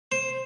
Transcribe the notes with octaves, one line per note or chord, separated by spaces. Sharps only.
C5